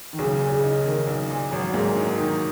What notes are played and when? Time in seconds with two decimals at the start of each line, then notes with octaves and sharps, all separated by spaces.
0.13 D#3
0.18 B1 C#3
0.40 A#2
0.52 C#3
0.64 D#4
0.85 D#3 A#3
1.07 B1
1.30 A#2
1.51 G#1 F#3
1.74 G#2 A#3
1.96 F#3 D#4
2.18 D#3 D#4